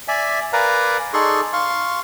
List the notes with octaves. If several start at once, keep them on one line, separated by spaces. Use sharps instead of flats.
D5 E5 G#5
A#4 B4 D5 F5 G#5 A#5
D#4 G#4 A4 D5 C6 C#6
F5 C6 C#6